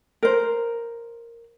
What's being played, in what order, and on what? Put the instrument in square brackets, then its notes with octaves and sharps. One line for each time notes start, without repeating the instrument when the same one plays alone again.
[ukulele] A#4 C5